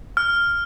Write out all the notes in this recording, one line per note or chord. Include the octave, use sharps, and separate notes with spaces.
F6